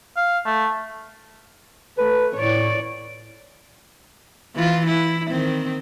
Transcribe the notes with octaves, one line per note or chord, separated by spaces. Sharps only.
F5
A3
A3 B4
A2 C#5 D5
E3 F4
E4
D#3 C4